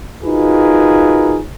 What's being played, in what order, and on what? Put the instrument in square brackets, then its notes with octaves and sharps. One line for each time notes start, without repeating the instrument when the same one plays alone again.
[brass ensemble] D#4 F4 F#4 G#4 A#4 B4